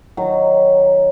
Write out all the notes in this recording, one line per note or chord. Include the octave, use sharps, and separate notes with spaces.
D#3 F#3